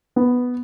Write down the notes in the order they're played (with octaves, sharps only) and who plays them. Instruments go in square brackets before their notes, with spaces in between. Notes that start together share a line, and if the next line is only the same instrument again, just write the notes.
[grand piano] B3